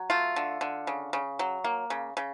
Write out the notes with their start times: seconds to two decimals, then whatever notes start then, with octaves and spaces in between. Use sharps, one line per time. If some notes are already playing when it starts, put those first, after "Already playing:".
Already playing: F#3
0.10 A3 F4
0.36 D3
0.61 D3
0.87 C#3
1.13 C#3
1.39 F#3
1.64 A#3
1.90 C#3
2.17 C#3